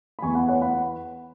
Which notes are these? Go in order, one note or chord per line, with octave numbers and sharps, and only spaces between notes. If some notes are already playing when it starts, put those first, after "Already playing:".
B5
E2 E3 B3 G#5 C#6
F#5 B5
C#5 F#5
F#5 B5